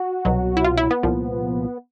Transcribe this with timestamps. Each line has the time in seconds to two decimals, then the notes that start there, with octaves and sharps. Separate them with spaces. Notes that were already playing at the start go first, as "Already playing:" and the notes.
Already playing: F#4
0.25 C2 B2 F#3
0.57 E4
0.64 F4
0.77 E4
0.91 B3
1.03 C2 A#2 F3